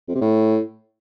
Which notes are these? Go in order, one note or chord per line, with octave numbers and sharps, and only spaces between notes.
F2
C3
A2